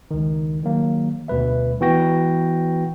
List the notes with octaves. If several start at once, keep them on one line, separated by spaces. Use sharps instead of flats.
C#2 D#3
D#3 F#3 A#3
D2 B2 G3 B4 E5
E3 B3 F#4 G5 A#6